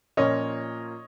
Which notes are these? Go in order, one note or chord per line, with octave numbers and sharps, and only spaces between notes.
A#2 F3 A#3 C#4 F4 C#5 D#5